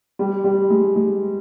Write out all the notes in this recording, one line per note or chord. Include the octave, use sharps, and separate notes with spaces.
G3
G3
G#3
G#3